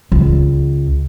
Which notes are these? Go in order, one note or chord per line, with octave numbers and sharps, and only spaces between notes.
C#2